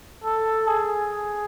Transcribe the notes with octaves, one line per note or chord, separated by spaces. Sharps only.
A4
G#4